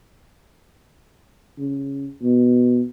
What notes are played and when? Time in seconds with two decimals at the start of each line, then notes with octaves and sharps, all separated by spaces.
1.58 C#3
2.23 B2